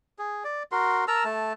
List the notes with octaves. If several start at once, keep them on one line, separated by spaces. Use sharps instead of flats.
G#4
D5
F#4 A#4 C6
A#4 A5 A#5 E6
A3 A5